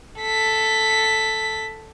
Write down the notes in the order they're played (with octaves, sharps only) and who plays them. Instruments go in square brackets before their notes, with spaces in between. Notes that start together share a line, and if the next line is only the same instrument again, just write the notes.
[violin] A4 B6